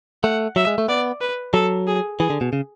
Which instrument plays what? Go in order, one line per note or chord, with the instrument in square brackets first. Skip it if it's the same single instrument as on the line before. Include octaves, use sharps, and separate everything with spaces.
[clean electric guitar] A3 [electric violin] F#5
[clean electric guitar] F#3 [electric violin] E5
[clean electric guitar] G#3
A3
[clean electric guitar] B3 [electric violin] D5
[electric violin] B4
[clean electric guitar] F#3 [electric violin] A4
[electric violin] G#4
[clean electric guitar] E3 [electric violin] G#4
[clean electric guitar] D3
B2
C#3